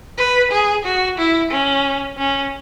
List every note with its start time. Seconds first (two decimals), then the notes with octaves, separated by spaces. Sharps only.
0.18 B4
0.51 G#4
0.85 F#4
1.18 E4
1.51 C#4
2.18 C#4